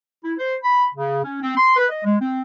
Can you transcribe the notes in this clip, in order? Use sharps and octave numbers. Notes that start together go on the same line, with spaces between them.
E4
C5
B5
C#3
C#4
C4
C6
B4
D#5
G#3
C4